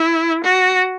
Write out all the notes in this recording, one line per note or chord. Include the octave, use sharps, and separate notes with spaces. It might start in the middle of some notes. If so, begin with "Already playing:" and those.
Already playing: E4
F#4